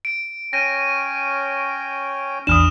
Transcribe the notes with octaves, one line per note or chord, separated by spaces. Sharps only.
D7
C#4 C#5 G5 A#6 D#7
A#1 E2 D4 D#6 F6 E7